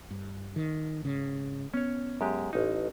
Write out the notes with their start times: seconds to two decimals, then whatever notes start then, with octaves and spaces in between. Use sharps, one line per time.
0.11 G2
0.56 D#3
1.02 G#1 C#3
1.74 B3 C#4 C#5
2.21 F#2 G#3 G4
2.53 A1 D#4